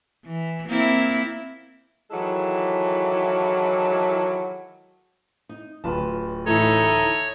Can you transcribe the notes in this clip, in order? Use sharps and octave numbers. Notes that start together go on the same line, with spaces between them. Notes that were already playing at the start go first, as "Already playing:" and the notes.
E3
A#3 C4 E4
D#3 E3 F#3 G#3 E4 A4
D#4
D1 F4 B4 A5
A2 E3 D#4 E4 A4 C#5